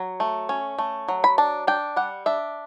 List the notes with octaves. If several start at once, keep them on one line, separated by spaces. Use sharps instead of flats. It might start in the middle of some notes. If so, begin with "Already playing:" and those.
Already playing: F#3
A3
C#4
A3
F#3
B5
D4 A5
D4 G5
G3 F#5
D4 E5